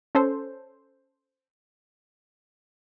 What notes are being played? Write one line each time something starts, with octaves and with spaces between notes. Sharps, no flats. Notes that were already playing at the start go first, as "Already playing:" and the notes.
C#4 A4 C5